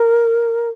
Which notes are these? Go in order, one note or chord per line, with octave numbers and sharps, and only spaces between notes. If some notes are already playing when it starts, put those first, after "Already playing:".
Already playing: A#4